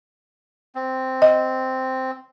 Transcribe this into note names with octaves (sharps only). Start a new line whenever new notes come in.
C4
D#5